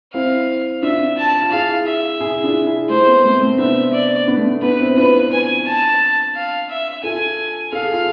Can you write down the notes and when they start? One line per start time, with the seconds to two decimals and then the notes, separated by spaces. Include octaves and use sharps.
0.13 C4 E4 F5
0.82 D4 F4 E5
1.17 A5
1.42 F4
1.51 E4 G#4 F5
1.86 E5
2.20 E4 G#4
2.44 D4 F4
2.67 E4 G#4
2.89 A3 C5
3.07 B3
3.24 A3 C4
3.41 A3 C4
3.58 B3 D4 E5
3.93 D5
4.27 B3 D4
4.37 A3
4.45 B3
4.62 B3 D4 B4
4.79 C4 E4
4.96 D4 F4 B4
5.31 G#5
5.66 A5
6.35 F5
6.69 E5
7.04 F4 A4 G#5
7.72 A4 F5
7.83 G#4
7.93 F4